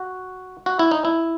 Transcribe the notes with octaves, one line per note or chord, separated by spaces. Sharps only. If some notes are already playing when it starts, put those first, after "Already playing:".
Already playing: F#4
F#4
E4
D#4
E4